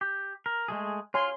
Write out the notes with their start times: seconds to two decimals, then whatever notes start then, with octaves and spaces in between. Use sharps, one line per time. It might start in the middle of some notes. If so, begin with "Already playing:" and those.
0.01 G4
0.46 A#4
0.68 G#3 A3 G#4
1.14 F4 C#5 G#5 C6